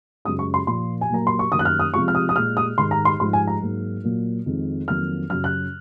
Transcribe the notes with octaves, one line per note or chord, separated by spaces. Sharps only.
F#2 C#3 G#3 D#6
C#6
C6
A#2 F3 A#3 C6
G#5
A#2 F#3 A#3 A#5
C6
C#6
F#2 D#3 A#3 D#6
F#6
F6
D#6
C3 F3 G#3 C#6
F6
D#6
D#6
A#2 G#3 F6
D#6
G#2 D#3 G#3 C6
A#5
C6
G#2 F3 G#3 C6
G#5
A#5
G#2 F#3 A#3
A#2 F#3 A#3
F2 D#3 G#3
F2 D#3 F#3 A#3 F6
F#2 C#3 F#3 F6
F#6